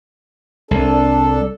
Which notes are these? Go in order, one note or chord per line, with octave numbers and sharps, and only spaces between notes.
C2 D4 A4